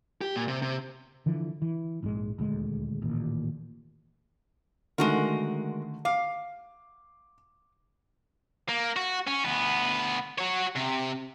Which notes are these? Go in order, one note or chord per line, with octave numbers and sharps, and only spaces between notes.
G4
A#2
C3
C3
D3 E3 F3
E3
A#1 G#2 D#3 G#3
D#1 D2 G#3
D#1 A1 D#2 A#2
D3 D#3 G#3 A3 F#4 A#4
F5 D6
A#3
F#4
C#4
D2 B3
F#4 C#5
C3